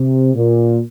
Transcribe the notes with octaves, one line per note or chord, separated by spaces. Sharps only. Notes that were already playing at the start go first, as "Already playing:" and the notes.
Already playing: C3
A#2